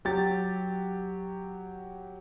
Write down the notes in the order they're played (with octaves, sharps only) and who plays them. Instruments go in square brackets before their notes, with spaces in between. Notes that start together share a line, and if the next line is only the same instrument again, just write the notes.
[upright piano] F#3 G4 A6